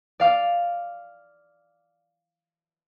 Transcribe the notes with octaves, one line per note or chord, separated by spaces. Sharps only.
D5 F5 D6